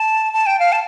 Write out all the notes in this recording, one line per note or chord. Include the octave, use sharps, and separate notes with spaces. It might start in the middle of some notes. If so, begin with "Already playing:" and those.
Already playing: A5
A5
G5
F5
A5